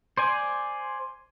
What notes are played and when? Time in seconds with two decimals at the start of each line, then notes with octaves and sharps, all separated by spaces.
0.17 C5 D5 G#5